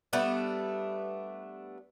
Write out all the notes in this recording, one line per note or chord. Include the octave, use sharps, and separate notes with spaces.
G3 A3 B3 D4